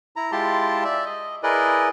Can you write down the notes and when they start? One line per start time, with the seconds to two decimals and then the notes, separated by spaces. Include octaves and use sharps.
0.16 E4 A#5
0.32 G#3 E4 F4 G4 A5 C6
0.84 D5 E5
1.05 D#5
1.43 E4 G#4 A#4 B4 D5 D#5